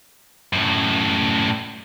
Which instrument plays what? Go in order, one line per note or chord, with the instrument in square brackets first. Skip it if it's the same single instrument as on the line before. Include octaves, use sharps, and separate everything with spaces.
[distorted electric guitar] F#2 A2